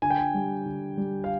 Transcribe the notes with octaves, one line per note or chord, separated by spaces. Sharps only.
D3 G#5
G5
G#5
G3
D3
G3
F5